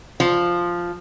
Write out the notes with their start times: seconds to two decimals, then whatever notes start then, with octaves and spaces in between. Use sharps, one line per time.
0.20 F3